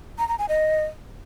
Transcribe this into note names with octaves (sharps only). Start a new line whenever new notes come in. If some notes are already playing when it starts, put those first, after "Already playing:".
A#5
A#5
G#5
D#5